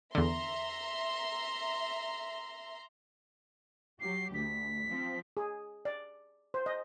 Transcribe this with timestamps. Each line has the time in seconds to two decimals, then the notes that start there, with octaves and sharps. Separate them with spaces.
0.15 E2 D3 E5 A#5 C6
4.00 F#3 G4 C7
4.34 D2 B6
4.88 F3 C4
5.37 G#4
5.85 D5
6.54 C5
6.66 D#5